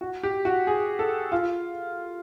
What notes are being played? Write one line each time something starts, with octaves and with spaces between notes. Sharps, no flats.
F#4
G4
F#4
G#4
A4
F4